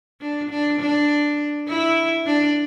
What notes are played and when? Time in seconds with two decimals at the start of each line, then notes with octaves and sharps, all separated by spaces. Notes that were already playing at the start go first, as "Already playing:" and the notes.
0.21 D4
0.50 D4
0.80 D4
1.68 E4
2.26 D4